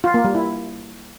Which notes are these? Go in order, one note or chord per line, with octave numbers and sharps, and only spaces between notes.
F4
A#3
G3
E4